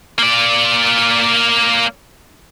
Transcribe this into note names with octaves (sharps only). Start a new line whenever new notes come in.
A#3 D5